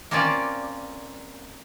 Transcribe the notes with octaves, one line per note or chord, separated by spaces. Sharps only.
A#3 C4 C#4 F4 D5